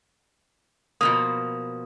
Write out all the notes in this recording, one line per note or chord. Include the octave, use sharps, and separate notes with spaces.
B2 F3 A#3 D#6